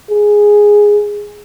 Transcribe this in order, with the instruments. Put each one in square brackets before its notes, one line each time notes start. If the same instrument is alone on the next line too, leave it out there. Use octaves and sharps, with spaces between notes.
[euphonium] G#4